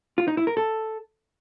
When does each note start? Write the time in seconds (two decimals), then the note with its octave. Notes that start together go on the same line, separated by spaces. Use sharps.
0.18 F4
0.28 D#4
0.37 E4
0.47 A#4
0.57 A4